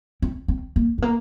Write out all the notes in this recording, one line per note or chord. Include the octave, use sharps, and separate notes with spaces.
C4
C4
A#3
G#3
A#3